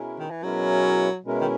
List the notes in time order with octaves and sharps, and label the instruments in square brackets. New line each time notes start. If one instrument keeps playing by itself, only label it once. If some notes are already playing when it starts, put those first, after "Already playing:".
Already playing: [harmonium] B2 G#3 C#4 E4 A#4
[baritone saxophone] D#3
E3
[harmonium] B2 G#3 C#4 E4 A#4 [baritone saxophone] F#3
[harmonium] B2 G#3 C#4 E4 A#4
[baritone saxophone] D#3